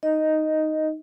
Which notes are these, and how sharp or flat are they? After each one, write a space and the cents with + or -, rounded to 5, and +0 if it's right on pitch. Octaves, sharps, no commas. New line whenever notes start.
D#4 +0 D#5 +0